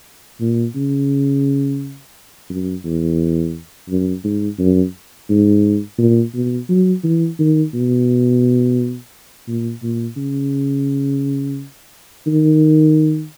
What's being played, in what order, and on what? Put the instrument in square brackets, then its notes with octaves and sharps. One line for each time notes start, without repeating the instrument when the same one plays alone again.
[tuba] A#2
C#3
F#2
E2
F#2
G#2
F#2
G#2
A#2
B2
F#3
E3
D#3
B2
A#2
A#2
C#3
D#3